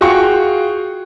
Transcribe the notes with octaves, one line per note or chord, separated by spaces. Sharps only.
F4 F#4 G#4 F5 G5 C#6